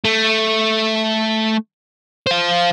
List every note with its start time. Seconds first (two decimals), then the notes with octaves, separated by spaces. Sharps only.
0.05 A3
2.27 C5 F5